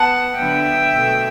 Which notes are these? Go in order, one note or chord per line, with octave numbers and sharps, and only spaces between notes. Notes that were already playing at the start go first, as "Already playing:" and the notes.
Already playing: B3 F#5 A5
D3 F#3 B3 E5 G5
B2 A3